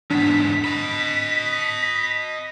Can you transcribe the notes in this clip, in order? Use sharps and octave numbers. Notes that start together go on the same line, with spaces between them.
E2 G#2 B3 D4 B6
D#5 B5